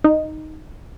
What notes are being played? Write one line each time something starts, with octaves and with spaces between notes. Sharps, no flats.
D#4